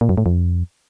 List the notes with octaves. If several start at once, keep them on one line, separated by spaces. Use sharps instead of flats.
A#2
F#2
A2
F2